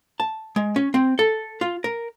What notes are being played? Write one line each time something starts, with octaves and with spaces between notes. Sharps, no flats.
A5
G#3
C#4
C4
A4
F4
A#4